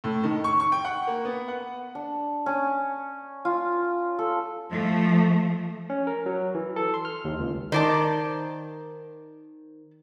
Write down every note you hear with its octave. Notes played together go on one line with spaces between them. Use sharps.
A2
D#3
C#6
C#6
G5
F#5
A#3
B3
F#5
D4
C#4
F4
A4
F3 A3
C#4
A#4
F#3
E3
A4
C6
F6
D#2
C#2
D#3 C5 D5 A5